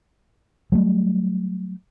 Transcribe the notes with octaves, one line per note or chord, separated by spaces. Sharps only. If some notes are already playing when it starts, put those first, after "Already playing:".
F#3 G3 A3